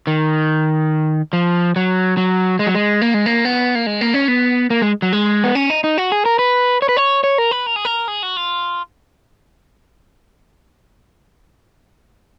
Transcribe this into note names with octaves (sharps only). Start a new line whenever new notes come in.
D#3
F3
F#3
F#3
G#3
F#3
G#3
A#3
G#3
A#3
B3
A#3
G#3
A#3
C#4
B3
A#3
G#3
F#3
G#3
B3
C#4
D#4
D#4
F#4
G#4
A#4
B4
C#5
B4
C#5
C#5
A#4
B4
A#4
G#4
A#4
G#4
F#4
F4